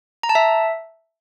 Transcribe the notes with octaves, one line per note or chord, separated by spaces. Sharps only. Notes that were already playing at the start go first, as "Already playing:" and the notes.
A#5
A5
E5